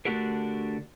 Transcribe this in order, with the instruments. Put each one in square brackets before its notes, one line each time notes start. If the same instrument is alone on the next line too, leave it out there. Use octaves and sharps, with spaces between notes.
[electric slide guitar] D3 A3 D4 F#4 G4 A#4